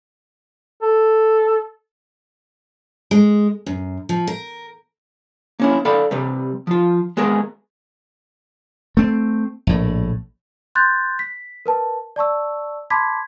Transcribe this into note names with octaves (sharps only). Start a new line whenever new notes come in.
A4
G#3
F#2
F3
A#4
A#3 C#4 E4
A4 D5 F5 G5 B5
C3 G3 B4
F3 F4
G#3 B3 G#4 A#4
A3 C4
A#1 A2
C6 F#6 G6 A6
B6
A#4 B4 A5
D5 A5 C#6 E6
A5 B5 C6 D6 G#6 B6